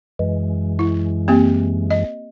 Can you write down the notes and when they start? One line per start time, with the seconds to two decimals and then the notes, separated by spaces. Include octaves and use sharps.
0.19 F#2 E3 G#3
0.79 E4
1.28 A#3 C4 G4
1.91 D#5